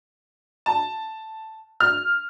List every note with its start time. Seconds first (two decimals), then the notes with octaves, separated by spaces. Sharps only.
0.66 A5
1.80 F6